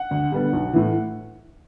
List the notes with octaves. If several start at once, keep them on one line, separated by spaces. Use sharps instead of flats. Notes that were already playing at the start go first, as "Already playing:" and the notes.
Already playing: F#5
D2
D3 G3 B3
B1
A2 E3